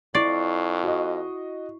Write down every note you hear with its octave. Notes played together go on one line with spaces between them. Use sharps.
F2 E4 D5 C#6 C7
F#4 D#5